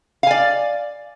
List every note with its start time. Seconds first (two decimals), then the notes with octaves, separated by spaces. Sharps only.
0.23 F5
0.27 G#5
0.31 D5